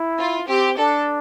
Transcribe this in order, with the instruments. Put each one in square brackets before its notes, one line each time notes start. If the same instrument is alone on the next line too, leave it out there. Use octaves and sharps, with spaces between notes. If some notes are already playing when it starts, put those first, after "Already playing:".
Already playing: [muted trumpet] E4
[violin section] F4
[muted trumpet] C4 [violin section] G4
[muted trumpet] D4 [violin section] A4